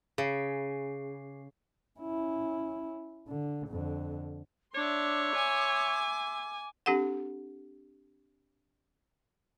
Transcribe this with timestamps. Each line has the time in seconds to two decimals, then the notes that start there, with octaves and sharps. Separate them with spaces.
0.18 C#3 G#4 C7
2.00 C#4 E4
3.28 D3
3.68 F2 D3
4.75 D4 C#5 E5 C6 D6
5.36 G#5
6.86 C4 D4 G4 A4 F#5